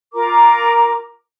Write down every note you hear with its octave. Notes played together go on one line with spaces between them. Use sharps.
F4 A#4 A#5 D6